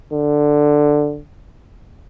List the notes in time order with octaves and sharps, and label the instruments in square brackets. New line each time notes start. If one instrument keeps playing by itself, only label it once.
[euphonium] D3